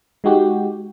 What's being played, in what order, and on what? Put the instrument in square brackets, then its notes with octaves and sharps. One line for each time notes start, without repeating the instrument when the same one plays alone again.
[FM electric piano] G#3 D#4 F#4 G4